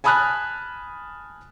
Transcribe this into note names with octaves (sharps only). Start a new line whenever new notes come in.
G#5 A5 B5 D#6 F6 F#6